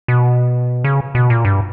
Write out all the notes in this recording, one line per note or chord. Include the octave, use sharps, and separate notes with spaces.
B2
C#3
B2
A#2
G2